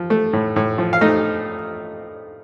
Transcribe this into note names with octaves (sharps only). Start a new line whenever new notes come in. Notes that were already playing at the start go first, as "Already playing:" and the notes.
Already playing: F3
A3
A2
A2
F3
F5
A3 D#4 D#5